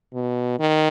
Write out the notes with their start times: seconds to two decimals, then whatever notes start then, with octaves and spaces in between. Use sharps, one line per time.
0.14 B2
0.60 D#3